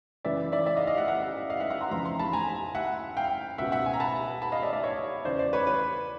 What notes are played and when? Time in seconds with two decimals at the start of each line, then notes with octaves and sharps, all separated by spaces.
0.25 F#2 C#3 E3 D5 E5
0.52 D5 E5
0.66 D5 E5
0.77 D#5 F5
0.87 D#5 F5
0.98 E5 F#5
1.08 E5 F#5
1.50 D#5 F5
1.60 E5 F#5
1.70 E5 F#5
1.81 A#5 C6
1.91 F2 C#3 E3 A#5 C6
2.05 A#5 C6
2.19 A5 B5
2.33 G#5 A#5
2.75 E5 F#5
3.17 F5 G5
3.58 C#2 B2 E5 F#5
3.72 E5 F#5
3.86 F#5 G#5
3.93 A#5
4.00 A5 B5
4.42 A5 B5
4.52 D#5 F5
4.62 D5 E5
4.73 D5 E5
4.83 C#5 D#5
5.25 E2 C#3 E3 C5 D5
5.39 C5 D5
5.53 B4 C#5
5.67 B4 C#5